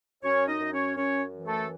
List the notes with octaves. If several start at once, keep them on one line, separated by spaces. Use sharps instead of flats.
F#2 C#4 C#5
D#4 D#5
F#2
C#4 C#5
F#2 C#4 C#5
E3
A3 A4